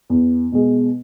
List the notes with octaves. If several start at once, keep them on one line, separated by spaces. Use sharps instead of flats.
E2
B2 G#3